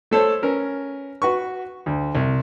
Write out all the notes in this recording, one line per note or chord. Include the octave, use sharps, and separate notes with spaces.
A3 A4 C5 C#5
C#4 A#4 B4
F#4 B4 C#6
D2
C2